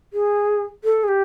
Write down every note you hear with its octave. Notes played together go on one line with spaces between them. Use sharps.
G#4
A4
G#4
G4